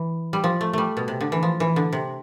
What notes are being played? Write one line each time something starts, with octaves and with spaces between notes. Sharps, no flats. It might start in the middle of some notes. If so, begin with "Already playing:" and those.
Already playing: E3
G3
F3
A3
G3 A3
B2
C3
D3
E3
F3
E3
D3
C3